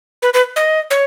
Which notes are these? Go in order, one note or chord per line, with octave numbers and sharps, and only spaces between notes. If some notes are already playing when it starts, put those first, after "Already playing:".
B4
B4
D#5
C#5